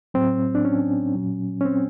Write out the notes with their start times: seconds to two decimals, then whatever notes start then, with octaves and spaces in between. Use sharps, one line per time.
0.14 A2 F#3 C4
0.55 D4
0.65 C#4
1.15 A#2 F#3
1.61 C#4
1.65 C4